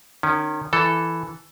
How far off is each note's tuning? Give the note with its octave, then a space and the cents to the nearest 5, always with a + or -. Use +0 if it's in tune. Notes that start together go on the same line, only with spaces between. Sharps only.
D#3 -30 C#4 +0
E3 +0 A4 +0